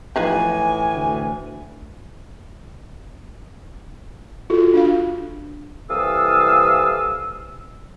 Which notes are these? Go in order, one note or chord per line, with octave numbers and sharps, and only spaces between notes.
A2 E3 F3 D#4 F4 B4 G#5
D2
F4 F#4 A4
D4 F5
C2 E3 A4 F5 D#6 E6